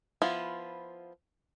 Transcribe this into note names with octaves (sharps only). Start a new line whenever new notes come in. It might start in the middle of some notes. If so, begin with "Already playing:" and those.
F3 B3 E4 F4